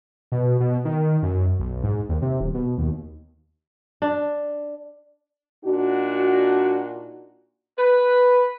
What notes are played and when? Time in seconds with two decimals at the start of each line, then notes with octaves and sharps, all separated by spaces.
0.32 B2
0.60 B2
0.85 D#3
1.23 F#2
1.60 B1
1.84 G#2
2.09 D#2
2.22 C3
2.41 D#1
2.54 B2
2.78 D#2
4.02 D4
5.65 A#2 D4 D#4 F#4
7.78 B4